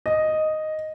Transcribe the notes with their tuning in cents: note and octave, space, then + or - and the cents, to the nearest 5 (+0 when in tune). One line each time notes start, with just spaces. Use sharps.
D#5 +0